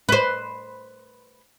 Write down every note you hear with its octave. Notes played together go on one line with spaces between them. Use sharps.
B4 C5